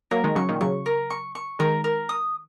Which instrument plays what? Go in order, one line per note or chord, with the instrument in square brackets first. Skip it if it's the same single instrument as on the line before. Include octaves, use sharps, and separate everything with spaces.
[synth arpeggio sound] F#3 A#3 [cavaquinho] A#4
[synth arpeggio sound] D#3 G#3
[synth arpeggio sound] C#3 F#3 [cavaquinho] C#6
[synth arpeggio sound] A#2 D#3
[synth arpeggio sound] C#3 F#3 [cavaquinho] C#6
[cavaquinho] A#4
C#6
C#6
[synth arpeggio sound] D#3 G#3 [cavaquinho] A#4
[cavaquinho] A#4
D#6